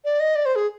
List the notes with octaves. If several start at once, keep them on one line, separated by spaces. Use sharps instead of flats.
D5
D#5
D5
C5
G#4